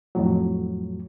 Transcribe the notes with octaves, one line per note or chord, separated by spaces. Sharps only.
F2 A2 F#3